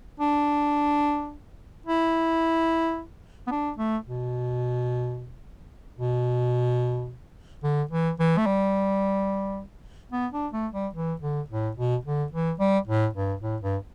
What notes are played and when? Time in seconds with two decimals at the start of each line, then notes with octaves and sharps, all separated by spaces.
0.20 D4
1.86 E4
3.47 B3
3.52 D4
3.78 A3
4.06 B2
5.98 B2
7.64 D3
7.91 E3
8.19 E3
8.38 A3
8.46 G3
10.12 B3
10.33 D4
10.53 A3
10.73 G3
10.95 E3
11.22 D3
11.50 A2
11.77 B2
12.05 D3
12.32 E3
12.60 G3
12.88 A2
13.15 G2
13.42 A2
13.62 G2